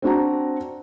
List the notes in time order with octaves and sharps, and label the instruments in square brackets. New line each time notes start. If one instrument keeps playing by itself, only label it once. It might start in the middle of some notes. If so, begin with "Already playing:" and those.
[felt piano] C4 D4 F#4 A#5